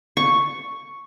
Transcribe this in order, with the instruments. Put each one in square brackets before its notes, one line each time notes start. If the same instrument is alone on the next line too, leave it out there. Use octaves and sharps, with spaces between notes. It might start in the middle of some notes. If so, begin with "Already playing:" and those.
[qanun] C#6